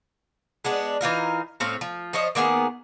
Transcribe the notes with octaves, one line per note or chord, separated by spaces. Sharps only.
G#3 B3 D4
E3 D#4 F4 A#4
A2 C4 C#5 F5
F3
F3 C5 C#5 D#5
D#3 A#3 B3 G#4